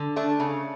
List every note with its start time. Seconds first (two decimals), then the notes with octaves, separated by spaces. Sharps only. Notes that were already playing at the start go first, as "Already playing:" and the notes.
Already playing: D3
0.16 A3 D4
0.40 C#3